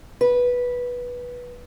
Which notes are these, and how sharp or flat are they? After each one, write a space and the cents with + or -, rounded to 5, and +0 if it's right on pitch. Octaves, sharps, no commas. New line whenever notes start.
B4 -10